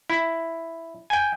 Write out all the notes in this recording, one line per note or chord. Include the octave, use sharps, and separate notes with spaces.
E4
G5 G#5